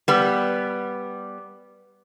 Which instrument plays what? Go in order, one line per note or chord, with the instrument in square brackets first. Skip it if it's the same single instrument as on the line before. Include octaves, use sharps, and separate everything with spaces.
[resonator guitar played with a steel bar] G3 B3